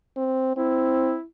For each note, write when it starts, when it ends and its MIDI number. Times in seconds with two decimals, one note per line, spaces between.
0.17 0.56 60
0.57 1.15 60
0.57 1.24 64